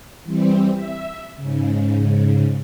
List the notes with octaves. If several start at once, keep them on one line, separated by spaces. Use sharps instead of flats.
E3 G3 C4
E5
G#2 C#3